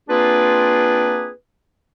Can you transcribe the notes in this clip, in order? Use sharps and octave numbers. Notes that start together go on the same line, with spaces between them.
A#3 C4 D4 F4 G#4 B4